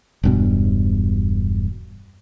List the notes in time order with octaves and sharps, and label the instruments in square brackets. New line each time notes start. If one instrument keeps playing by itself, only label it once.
[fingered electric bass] E1 G2 B2